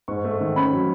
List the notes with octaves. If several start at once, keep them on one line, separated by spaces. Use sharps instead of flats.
G#2 C#6
A3
D#3
C#4 B5
F#3